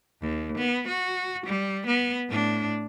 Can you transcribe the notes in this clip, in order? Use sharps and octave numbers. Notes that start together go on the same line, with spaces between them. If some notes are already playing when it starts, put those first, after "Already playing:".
D#2
B3
F#4
G3
B3
A2 D4